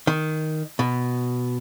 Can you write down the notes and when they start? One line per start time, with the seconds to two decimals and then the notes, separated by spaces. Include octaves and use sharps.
0.07 D#3
0.79 B2